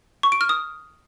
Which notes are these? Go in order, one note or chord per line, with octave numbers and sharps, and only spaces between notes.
C#6
D7
F6
D#6